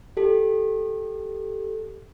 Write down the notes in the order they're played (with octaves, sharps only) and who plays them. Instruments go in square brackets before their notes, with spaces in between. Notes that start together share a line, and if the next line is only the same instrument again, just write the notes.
[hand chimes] G4 A4